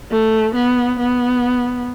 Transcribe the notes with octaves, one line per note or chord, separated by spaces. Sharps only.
A3
B3
B3